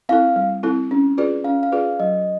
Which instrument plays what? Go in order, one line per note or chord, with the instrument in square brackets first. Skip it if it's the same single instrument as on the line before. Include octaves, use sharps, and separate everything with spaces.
[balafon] C4 E4 A4 [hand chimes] F5
[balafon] G3
C4 E4 A4
C#4
F4 G#4 B4 D5
[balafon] C#4 [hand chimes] F5
[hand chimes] F5
[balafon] F4 G#4 B4 D5
[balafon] F#3 [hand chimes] D#5